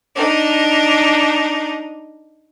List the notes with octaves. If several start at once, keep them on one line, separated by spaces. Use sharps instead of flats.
D4 D#4